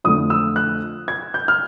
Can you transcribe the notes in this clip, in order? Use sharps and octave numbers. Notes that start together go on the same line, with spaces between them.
F2 D3 F3 A3 D#6
E6
F#6
G#6
G6
F6